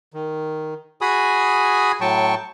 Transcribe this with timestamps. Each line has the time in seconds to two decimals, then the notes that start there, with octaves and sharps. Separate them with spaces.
0.14 D#3
1.01 F#4 G#4 G#5 B5 D#6
2.01 A2 F#3 G5 A5 C#6